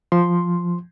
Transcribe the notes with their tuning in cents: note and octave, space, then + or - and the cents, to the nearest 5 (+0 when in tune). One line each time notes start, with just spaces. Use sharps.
F3 +0 C6 +0